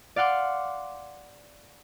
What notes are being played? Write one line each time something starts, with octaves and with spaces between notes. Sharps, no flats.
D5 F5 F#5 C6 D6